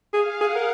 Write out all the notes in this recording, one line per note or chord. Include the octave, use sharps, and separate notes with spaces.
G#4 F5
G#4 F#5
A#4